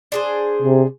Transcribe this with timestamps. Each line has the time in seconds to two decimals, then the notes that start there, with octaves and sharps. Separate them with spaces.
0.12 D4 G#4 C5
0.62 C3